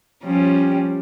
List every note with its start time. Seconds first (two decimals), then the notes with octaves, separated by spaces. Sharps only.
0.23 F3 G3 C#4